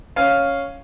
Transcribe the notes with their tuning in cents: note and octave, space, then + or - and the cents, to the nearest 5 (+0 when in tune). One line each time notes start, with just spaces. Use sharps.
C#4 +0 F5 +0